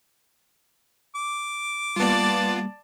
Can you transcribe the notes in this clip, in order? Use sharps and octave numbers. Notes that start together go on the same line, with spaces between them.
D6
G3 A#3 B3 F4 D5 A5